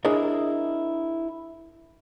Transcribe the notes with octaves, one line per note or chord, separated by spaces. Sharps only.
D4 E4 G#4 A#4 C#5 D#5